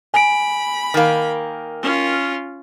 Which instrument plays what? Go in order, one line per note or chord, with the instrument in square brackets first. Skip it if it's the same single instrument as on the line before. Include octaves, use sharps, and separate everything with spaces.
[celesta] G#5 D7 [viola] B5
[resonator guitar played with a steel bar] D#3 A#3
[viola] C#4 F4